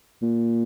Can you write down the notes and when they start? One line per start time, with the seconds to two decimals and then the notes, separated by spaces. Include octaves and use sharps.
0.22 A#2